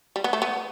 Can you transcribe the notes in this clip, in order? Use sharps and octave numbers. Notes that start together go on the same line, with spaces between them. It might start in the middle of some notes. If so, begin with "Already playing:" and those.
G3
B3
A3
B3